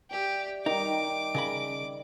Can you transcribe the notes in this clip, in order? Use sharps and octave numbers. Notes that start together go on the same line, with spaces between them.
G4 D5 E5
D#3 G3 D#4 D6
C#3 A#4 B5